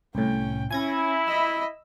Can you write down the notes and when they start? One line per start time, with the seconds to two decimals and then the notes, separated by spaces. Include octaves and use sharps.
0.15 C2 A2 C#4 G5
0.71 C#4 E4 G#5 G#6 A#6
1.28 D#5 B5 E6